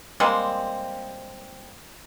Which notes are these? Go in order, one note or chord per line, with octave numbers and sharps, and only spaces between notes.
G3 G#3 A#3 C4